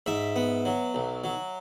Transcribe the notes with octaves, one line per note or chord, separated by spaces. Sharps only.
G#2 E5
B3
F#3
B1
F#3